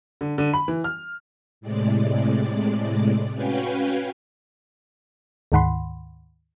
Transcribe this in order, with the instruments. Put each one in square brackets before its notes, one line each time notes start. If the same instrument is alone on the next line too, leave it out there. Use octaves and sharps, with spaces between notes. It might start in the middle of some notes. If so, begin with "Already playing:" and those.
[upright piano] D3
D3
B5
E3
F6
[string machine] A2 C3 G#3 D5
C#4 F#4 B4 F5 G5 G#5
[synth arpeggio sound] D2 G#2 D#3 F#5 B5 C6